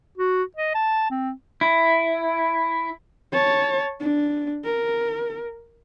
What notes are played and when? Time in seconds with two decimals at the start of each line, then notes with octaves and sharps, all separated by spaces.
0.18 F#4
0.56 D#5
0.75 A5
1.10 C4
1.61 E4
3.32 C#5 A5
4.00 D4
4.64 A#4